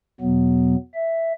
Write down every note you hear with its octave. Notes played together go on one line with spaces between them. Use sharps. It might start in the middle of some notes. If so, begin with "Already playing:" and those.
E2 B2 F#3 B3
E5